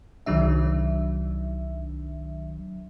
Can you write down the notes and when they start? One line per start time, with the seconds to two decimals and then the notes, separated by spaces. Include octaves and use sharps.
0.26 C2 D#3 F#3 D4 E5